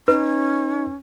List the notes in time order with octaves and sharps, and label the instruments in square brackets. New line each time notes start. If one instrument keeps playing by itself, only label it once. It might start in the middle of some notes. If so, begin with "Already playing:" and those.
[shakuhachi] C#4 [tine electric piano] D#4 [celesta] B4